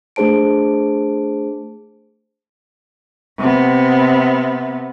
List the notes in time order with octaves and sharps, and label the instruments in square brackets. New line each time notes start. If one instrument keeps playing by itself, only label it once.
[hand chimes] A3 D4 G#4 C5 A5 D7
[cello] C3 B3